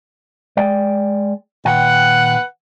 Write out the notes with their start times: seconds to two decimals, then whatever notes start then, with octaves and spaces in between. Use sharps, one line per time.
0.57 G#3 D5 G5
1.65 A#2 D#3 B4 F#5 G5